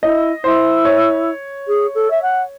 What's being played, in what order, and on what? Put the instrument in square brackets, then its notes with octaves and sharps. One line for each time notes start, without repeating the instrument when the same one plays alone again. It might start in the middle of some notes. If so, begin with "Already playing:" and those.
[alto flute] E4 [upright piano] D#5
[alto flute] E4 [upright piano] C5
[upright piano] C#5
[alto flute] G#4
A4
E5
F#5